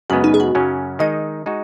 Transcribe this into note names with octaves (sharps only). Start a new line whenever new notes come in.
F#2 C#3 G#3 B3 F#4
D#4
G#4
F#4
F#2 C#3 F#3 C#4
D#3 G#3 D#4 D#5
G#3 D#4 F#4